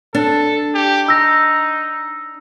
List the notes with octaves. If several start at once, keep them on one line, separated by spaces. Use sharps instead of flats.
D4 A4
G4
D#4 E6 A#6